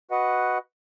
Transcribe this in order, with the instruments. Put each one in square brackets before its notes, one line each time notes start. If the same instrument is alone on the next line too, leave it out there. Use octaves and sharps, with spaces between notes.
[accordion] F#4 B4 D#5 F#5